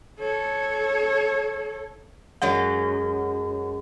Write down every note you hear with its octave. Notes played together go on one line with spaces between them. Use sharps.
A4 C#5
F#2 F#3 G#3 F#5